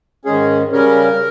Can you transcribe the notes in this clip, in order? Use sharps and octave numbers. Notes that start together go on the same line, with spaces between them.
G#2 D#3 G#3 C#4 G#4
C#3 G3 C#4 A#4